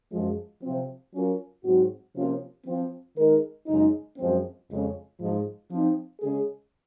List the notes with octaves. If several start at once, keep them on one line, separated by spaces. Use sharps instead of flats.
F#2 F3 G#3
C3 F3 C4
F#3 C#4 F4 A#4
G#2 F#3 C4 F#4
C3 F3 A#3 C#4 F4
F3 C4 F4
D#3 G#3 D#4 A#4
F#2 C#3 G#3 D#4
F#2 F3 G#3 C4
F2 C#3 G#3 C#4
G#2 F3 G#3
F3 C4 D#4
C#3 G#3 C#4 G#4